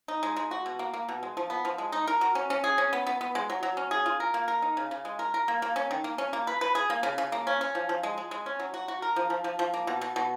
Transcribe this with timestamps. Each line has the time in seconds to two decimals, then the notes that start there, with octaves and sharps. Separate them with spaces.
0.08 D#4
0.23 G#3
0.36 G#3
0.51 F#4
0.66 B2
0.79 A#3
0.94 A#3
1.08 B2
1.23 G#3
1.37 F3
1.50 B3
1.65 F3
1.78 G#3
1.92 D#4
2.07 A#4
2.21 F#4
2.35 C#4
2.50 C#4
2.64 G#4
2.78 C#4
2.93 B3
3.07 B3
3.21 B3
3.35 G#3
3.50 F#3
3.63 F#3
3.77 C#4
3.91 G#4
4.06 F4
4.20 A#4
4.34 A#3
4.48 A#4
4.62 D#4
4.77 C#3
4.91 C#3
5.05 G#3
5.19 A#4
5.34 A#4
5.48 A#3
5.62 A#3
5.76 C#4
5.91 D#3
6.04 A#3
6.18 C#4
6.33 A#3
6.47 B4
6.61 B4
6.75 G#4
6.90 A#3
7.03 C#3
7.18 C#3
7.32 A#3
7.47 C#4
7.61 C#4
7.75 F3
7.89 F3
8.03 G#3
8.18 G#3
8.31 G#3
8.46 C#4
8.59 F#3
8.74 F#4
8.88 F#4
9.02 A#4
9.16 F3
9.30 F3
9.44 F3
9.59 F3
9.74 A#3
9.87 B2
10.01 B2
10.16 B2